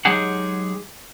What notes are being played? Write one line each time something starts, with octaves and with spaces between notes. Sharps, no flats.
F#3 G#3 D#4 G4 G#4 F#5